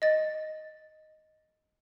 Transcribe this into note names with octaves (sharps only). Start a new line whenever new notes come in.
D#5 A6